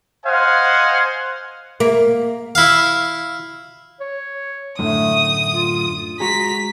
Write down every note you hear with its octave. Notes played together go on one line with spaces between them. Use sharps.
C5 D#5 F5 F#5 G#5
A#3
E4 F5
C#5
F#2 A2 D3 A3 D#6
F4
G#3 F#4 G#4 A#5 B6